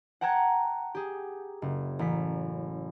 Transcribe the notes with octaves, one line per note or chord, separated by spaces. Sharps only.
F#5 G5 A5 A#5 F#6 G#6
G4 G#4
F#1
A1 B6